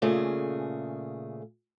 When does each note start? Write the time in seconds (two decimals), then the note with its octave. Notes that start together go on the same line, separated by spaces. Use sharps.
0.02 A#2 C#3 A3 G#4